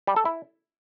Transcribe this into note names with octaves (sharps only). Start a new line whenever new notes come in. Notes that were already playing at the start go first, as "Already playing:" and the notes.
G3
A4
E4